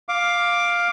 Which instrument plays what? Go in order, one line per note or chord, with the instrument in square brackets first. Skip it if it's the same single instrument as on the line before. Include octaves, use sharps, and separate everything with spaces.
[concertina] F5 D6